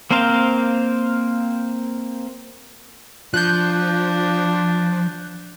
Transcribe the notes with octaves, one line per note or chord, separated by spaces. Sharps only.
A#3 C4 A#4 C5 F5
F3 D4 F#6 G6